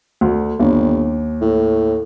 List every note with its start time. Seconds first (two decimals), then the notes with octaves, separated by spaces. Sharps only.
0.21 D2
0.60 G1 D#2
1.41 A2